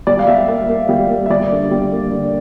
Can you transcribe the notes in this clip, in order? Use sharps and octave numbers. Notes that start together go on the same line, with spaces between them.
G3 D5
F5
G3 E5
A#3 E5
A#3
G3
A#3
E5
G3 D5
D3
G3
A#3
D3